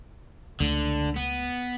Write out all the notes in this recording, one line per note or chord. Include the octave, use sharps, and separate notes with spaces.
C#2 D3 A3
B3